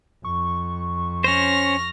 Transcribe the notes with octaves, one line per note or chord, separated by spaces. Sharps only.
F2 C#6
C#4 C5 F6 A#6